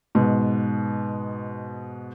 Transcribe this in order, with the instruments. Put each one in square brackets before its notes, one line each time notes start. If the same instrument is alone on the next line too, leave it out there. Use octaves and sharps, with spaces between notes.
[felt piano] G#2 B2